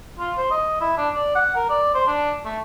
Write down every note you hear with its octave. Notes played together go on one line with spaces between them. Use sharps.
F4
C5
D#5
E4
D4
D5
F#5
A#4
D5
C5
D4
A3